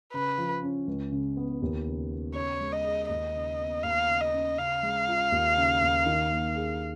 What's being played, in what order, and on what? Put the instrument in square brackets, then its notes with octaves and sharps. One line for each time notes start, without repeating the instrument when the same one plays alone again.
[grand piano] C#3 [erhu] B4
[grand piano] F3
C#4
C#2
C#3
B3
D#2
C#3
B3
[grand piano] C#3 [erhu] C#5
[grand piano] G#3
[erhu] D#5
[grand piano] G#4
[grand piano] D#2 [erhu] D#5
[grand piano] C#3
B3
[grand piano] D#2 [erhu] F5
[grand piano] C#3
[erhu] D#5
[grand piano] C#4
[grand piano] C#3 [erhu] F5
[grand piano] G#3
F4
D#2
C#3
D#2
D#3
A#3
G#4